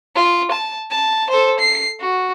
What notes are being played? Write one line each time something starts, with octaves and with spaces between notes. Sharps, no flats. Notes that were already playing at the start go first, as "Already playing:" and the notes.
F4
A5
A5
A4 C5
C7
F#4